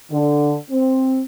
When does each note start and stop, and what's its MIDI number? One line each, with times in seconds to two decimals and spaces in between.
0.11 0.54 50
0.70 1.22 60